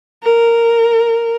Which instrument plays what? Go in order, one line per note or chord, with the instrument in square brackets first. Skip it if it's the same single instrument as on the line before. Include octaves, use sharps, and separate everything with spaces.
[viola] A#4